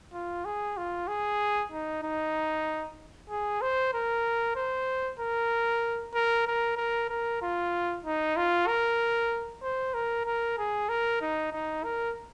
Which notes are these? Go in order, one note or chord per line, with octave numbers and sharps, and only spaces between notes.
F4
G#4
F4
G#4
D#4
D#4
G#4
C5
A#4
C5
A#4
A#4
A#4
A#4
A#4
F4
D#4
F4
A#4
C5
A#4
A#4
G#4
A#4
D#4
D#4
A#4